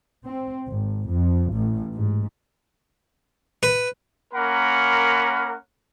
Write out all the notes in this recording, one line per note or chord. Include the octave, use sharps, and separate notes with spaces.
C4
G#1
F2
A1
G#2
B4
A#3 C#4 A#4 F#5 B5